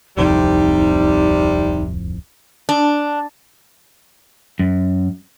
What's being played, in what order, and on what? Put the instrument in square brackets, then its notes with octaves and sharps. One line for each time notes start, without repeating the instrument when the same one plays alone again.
[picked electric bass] D1 C2 F2 [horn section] C3 G3 [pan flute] D#4
[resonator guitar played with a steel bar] D4
[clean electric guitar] F#2